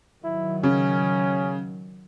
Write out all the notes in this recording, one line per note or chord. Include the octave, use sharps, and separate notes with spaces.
D#3 F#3 E4
C#3 C#4